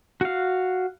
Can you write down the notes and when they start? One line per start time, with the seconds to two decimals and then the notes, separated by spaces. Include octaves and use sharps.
0.21 F#4 F5